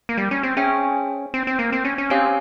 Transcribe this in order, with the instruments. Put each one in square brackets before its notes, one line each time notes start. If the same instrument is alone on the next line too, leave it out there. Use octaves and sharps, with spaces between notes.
[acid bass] A#3
G3
C#4
C4
[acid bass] C#4 [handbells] G#4 C5 E5 G5
[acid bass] C4
C4
A#3
C4
C#4
C#4
[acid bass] C4 [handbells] C#4 G4 C#5 F5 G#5